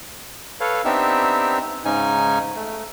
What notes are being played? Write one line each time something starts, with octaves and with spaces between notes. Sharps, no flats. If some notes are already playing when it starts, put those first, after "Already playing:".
A4 B4 C#5 F5
B3 C4 D4 D#4 G4 E5
G#2 C#3 C#4 D#4 G#5
A3